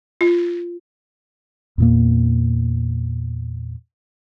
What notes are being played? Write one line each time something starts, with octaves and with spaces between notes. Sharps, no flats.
F4
E2 A#2 A#3